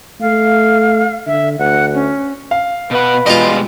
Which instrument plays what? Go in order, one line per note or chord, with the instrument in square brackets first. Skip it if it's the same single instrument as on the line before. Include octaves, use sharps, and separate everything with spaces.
[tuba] A3 [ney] F5
[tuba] D3 [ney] E5
[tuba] D2 [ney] F#5
[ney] C#4
[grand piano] F5
[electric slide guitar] B2 F#5 [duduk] B4
[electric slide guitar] B2 G3 G#3 [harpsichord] F4 D#5